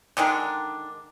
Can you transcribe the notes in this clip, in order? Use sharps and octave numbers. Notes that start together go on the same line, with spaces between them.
D3 D#3 G#3 D4